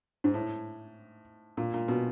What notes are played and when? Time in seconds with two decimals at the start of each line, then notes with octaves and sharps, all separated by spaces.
0.24 G#2
0.34 A2
1.57 A#2
1.74 A#2
1.88 B2